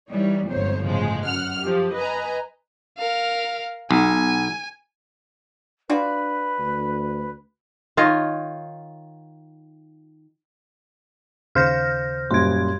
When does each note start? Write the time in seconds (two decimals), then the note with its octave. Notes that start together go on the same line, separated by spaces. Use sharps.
0.11 E3 G3 D#4 C#5
0.50 G1 F2 G#2 C5 C#5
0.86 A2 C#3 F3 G#3
1.27 F#2 F#5 F6
1.64 F3 G4
1.97 B4 D#5 G#5 A#5
2.98 A#4 F5
3.91 B1 G#5
5.90 D4 F4 F#4 B4 D5
6.59 D2
7.97 D#3 F4 C#5 D#5
11.55 D#2 C#3 C5 F5 F6 G6 A#6
12.31 F#2 A#2 G3 C6 G#6